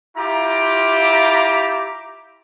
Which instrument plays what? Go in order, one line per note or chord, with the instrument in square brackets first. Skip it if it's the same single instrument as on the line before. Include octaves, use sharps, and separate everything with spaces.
[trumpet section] E4 F4 G4 A#5 D6